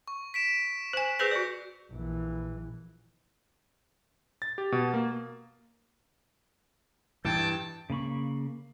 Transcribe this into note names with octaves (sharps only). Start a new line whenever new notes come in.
C#6
B6 D7 E7
C5 G#5
G#4 B4 C5 G6 A#6 C7
F#4 D5
A#1 E3
A6
G4
B2
A#3
G2 E3 G5 A5
C#3 A#3 B5 C#6